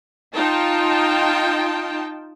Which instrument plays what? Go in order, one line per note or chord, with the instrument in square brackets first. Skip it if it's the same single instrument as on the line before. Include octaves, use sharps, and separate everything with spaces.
[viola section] D#4 F4 G5 A5